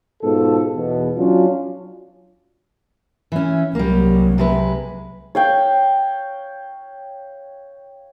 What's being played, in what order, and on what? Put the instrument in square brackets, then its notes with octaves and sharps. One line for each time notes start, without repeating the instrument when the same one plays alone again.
[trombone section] G#2 B2 F4 A4
E2 B2
F#3 C#4 D4 F4
[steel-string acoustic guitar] E3 C#4
[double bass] C2 F#3 [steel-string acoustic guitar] G3 A#3
[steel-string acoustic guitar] C3 G#3 B4
[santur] C#5 F5 G5